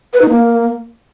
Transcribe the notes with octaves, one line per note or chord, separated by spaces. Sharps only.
B4
D#4
A#3